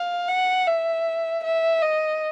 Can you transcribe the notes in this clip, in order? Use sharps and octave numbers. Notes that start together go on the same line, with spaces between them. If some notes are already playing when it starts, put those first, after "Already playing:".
Already playing: F5
F#5
E5
E5
D#5